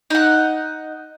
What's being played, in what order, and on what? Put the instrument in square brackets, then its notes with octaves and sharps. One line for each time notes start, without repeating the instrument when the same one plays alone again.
[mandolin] D#4 F#5